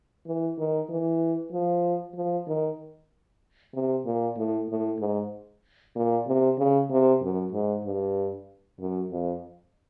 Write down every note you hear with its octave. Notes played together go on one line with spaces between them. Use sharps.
E3
D#3
E3
F3
F3
D#3
C3
A#2
A2
A2
G#2
A#2
C3
C#3
C3
F#2
G#2
G2
F#2
F2